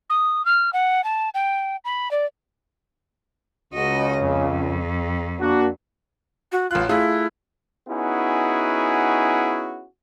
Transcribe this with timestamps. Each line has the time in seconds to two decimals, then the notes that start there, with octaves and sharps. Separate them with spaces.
0.10 D#6
0.45 F6
0.73 F#5
1.04 A5
1.34 G5
1.85 B5
2.11 D5
3.73 C#2 C#3 F#4 D#5
4.18 F2
5.39 A#3 D4 F#4
6.52 F#4
6.71 A1 F4 F#6
6.89 A3 E4 F4 G#4
7.89 B3 C#4 D#4 E4 F#4 G#4